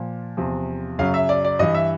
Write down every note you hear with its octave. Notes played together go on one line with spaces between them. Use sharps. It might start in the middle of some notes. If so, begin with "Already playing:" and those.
Already playing: A#2 F3
E2 C3 F3
F#2 C#3 F#3 F5
E5
D5
D5
G2 E3 D#5
E5